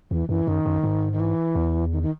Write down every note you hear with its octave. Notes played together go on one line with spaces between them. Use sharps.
E2 E3
F#2 E3
F#2 D#3
F#2
G#2
D#3
E3
E2
D#3
D#3